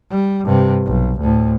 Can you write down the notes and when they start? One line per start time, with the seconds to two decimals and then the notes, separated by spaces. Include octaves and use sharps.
0.11 G3
0.45 G2 C3
0.86 B1
1.20 D2 A2